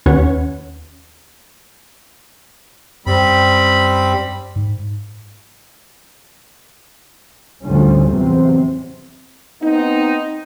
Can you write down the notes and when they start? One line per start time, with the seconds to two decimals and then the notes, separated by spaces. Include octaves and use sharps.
0.06 D#2 C#4 B4 C#5 F#5
3.06 F#2 G3 C4 B5
4.56 G#2
7.62 D2 A2 D3 F3 G3 C#4
8.06 E2 C3 F#3 C4
9.61 B3 C4 D#4